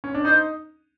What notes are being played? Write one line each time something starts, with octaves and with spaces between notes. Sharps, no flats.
C#4
D4
D#4 C5